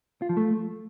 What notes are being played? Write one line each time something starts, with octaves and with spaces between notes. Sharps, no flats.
F4
F3
A3